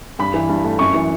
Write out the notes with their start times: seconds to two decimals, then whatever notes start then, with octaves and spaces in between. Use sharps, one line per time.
0.19 G2 B5
0.34 E3
0.49 G2
0.64 A3
0.79 F#2 C#6
0.94 E3